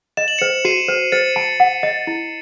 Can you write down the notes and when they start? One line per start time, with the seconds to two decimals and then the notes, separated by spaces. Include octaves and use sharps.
0.17 D#5 E7
0.28 F#7
0.38 C5 C#7 E7
0.65 F#4 C7 D#7
0.88 C5
1.12 C5 A6 C#7
1.36 A5
1.60 F#5
1.83 D#5
2.07 E4